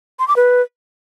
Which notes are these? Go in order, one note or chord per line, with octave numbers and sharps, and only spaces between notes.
C6
D6
B4